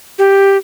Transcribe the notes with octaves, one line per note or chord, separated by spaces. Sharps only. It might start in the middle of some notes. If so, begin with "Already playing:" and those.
G4